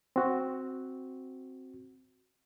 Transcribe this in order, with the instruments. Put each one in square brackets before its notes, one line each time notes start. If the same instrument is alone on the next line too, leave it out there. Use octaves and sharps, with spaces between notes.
[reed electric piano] C4 F#4